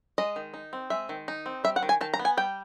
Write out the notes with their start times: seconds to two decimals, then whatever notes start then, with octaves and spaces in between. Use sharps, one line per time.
0.18 G#3 D#5
0.36 D#3
0.54 D#4
0.73 C4
0.90 G#3 E5
1.09 D#3
1.28 D#4
1.46 C4
1.64 G3 E5
1.76 F#5
1.83 D#3
1.89 G#5
2.01 D#3 A5
2.14 A#5
2.19 B3
2.25 G#5
2.37 G3 G5